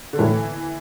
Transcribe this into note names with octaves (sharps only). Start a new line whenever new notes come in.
D3
A2 E3